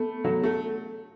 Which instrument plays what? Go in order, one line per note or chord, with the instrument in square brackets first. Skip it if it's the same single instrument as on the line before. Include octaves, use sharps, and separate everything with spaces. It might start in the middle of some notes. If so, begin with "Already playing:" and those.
Already playing: [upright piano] A3 [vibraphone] B3
[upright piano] F#3 [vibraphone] A4
[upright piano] A3